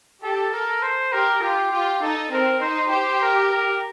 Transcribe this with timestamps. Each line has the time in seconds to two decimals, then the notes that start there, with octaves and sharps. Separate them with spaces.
0.22 G4 A4
0.52 A4 A#4
0.82 C5
1.12 G4 A#4
1.42 F4 G4
1.72 F4 G4
2.02 D#4 A4
2.32 C4 A#4
2.61 D#4 C5
2.91 G4 C5
3.21 A#4
3.51 A#4